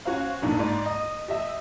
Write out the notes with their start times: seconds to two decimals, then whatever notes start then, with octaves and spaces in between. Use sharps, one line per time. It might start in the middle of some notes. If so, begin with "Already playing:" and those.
0.05 C#4 F#4 C5 F5
0.42 F#1 A2 D4 D#4
0.59 G#2 D5
0.86 D#5
1.28 G4 D#5 E5